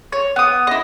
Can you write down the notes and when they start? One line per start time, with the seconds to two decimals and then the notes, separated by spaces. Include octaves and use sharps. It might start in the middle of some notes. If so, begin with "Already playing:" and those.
0.12 C#5
0.36 B3 D#6
0.67 E4 D#5